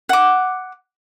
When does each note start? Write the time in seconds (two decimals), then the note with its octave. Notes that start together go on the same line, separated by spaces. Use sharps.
0.09 F#5 D6